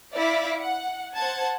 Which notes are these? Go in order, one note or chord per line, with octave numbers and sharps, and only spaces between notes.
E4 D5 E5 F5 D6
F#5
C5 F#5 A5 G#6